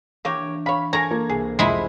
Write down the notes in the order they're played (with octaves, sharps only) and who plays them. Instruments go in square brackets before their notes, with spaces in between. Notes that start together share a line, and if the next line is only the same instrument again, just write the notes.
[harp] E3 D4 D6 [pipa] A#3 G4 C#5
[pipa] C#5 B5 [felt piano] F5
[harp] A4 [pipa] A#4 C#5 [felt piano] G#5 G#6 [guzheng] A#5
[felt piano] A#3
[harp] C2 [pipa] G#4
[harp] F1 C3 F4 [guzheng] G#3 E4 [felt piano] B5 C6